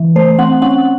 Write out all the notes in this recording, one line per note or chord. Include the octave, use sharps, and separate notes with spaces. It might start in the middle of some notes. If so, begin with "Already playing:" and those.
Already playing: E3
A3 C5
C4 F#5
C#4 F#5